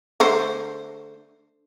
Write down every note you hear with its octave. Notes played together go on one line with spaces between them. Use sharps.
D3 A3 C5